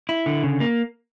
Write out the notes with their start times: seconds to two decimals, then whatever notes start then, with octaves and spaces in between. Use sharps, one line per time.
0.09 E4
0.26 D3
0.43 C#3
0.60 A#3